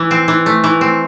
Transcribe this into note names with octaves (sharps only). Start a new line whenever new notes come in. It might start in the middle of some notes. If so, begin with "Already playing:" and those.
Already playing: E3
C4
E3
A3
E3
C4